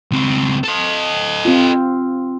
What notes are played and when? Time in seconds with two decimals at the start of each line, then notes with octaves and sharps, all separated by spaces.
0.11 C#2 C4
0.64 A4 D#5
1.45 C4 F4